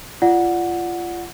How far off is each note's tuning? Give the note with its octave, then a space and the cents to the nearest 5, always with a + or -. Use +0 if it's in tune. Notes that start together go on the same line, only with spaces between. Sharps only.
F4 -25 D5 +0 F#5 -10